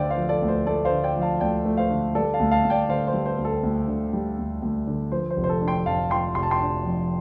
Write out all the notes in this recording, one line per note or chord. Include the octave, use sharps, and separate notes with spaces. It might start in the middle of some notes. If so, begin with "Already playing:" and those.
Already playing: D2 D3 A3 C5 D5 F5 G5
C5 F5
F3
A4 D5
D2
C5
A3 A4 D5
C5 F5
D3
D5 G5
F3
F5 A5
D2 D5 G5
A3
C5 F5
D3
G3 A4 D5
F5 A5
D2
F5 A5
D2
D5 G5
D3 C5 F5
C5
G3
C5
D2
A4
D2
D3
G3
D2
D2
D3
F3 C5
C5
F1
C5
A4
D4
G5 C6
F2 F5 A5
F3 G5 C6
F1 C6
A5
G5 C6
D4
F2